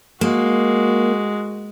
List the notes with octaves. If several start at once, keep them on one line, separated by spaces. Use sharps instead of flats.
G#3 A#3 F#4